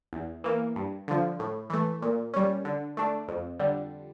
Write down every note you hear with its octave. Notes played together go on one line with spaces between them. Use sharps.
E2
E3 A#3
G2
D3 F3
A2
E3 A3
A#2
G3 C#4
D3
A3 D4
F2
D3 G3